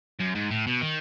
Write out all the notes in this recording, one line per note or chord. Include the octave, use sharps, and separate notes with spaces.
F#2
G#2
A2
B2
D#3